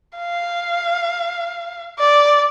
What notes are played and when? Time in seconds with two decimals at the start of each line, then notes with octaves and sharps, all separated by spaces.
0.17 F5
1.99 D5